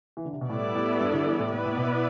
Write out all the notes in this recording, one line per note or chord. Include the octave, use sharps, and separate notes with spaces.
E3
D3
C3
B2
A2 G3 B3 E4 A4 D5
A2
G2
D3
E3
A2
A2 B3 E4 B4 D5
A2
B2